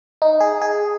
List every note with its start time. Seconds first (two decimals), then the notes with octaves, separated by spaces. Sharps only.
0.22 D#4
0.40 G#4
0.62 G#4